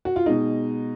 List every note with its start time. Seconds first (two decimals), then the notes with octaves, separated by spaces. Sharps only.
0.05 F#4
0.16 F4
0.26 B2 G#3 D#4